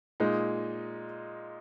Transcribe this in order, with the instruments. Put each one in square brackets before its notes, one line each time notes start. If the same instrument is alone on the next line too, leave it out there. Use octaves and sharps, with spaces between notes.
[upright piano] A#2 G#3 D#4